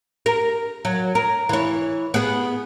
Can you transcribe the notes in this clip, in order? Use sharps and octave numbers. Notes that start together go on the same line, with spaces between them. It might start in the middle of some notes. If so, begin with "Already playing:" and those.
A#4
F#3
A#4
E3 C#5
B3 G#4